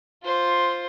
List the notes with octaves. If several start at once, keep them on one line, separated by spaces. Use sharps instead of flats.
F4 C5